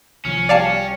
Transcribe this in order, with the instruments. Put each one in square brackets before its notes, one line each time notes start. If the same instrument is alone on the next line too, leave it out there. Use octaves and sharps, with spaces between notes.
[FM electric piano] C2 [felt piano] F3 F6 [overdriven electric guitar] C#4
[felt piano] G3 G5 F6 [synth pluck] D5 F5 A5